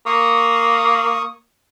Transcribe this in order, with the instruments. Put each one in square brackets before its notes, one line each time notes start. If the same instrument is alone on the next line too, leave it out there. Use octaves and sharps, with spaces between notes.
[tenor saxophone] A#3 [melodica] C#6 D#6